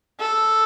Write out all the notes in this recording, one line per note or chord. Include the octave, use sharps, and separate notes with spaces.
A4